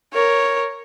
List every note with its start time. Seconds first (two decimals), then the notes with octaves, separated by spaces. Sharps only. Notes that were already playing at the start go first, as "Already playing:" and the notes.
0.13 A#4 C#5